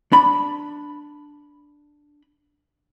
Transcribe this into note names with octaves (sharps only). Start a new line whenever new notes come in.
D4 B5